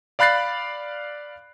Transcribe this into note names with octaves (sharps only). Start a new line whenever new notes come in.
D5 F5 B5 F#6 A6 C7